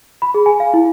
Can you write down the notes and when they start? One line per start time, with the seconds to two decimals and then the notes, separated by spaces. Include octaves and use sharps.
0.22 B5
0.34 G#4
0.46 G#5
0.60 F5
0.74 E4